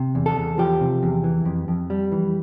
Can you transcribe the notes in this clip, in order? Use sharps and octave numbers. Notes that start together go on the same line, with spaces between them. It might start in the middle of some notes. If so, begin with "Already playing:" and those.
Already playing: C3
E2
A4
E2
F3 G4
C3
E2
E3
F2
F2
G3
E3